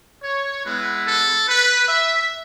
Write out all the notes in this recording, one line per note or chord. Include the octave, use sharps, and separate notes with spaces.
C#5
G#3 B3 E4 B4
A4
B4
E5